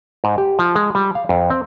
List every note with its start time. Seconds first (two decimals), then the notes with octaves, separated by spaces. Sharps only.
0.24 G#2
0.38 G4
0.59 F3
0.75 G#3
0.95 G3
1.15 F5
1.29 F2
1.50 C4